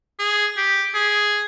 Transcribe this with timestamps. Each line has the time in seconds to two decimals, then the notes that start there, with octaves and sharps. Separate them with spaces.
0.19 G#4
0.57 G4
0.94 G#4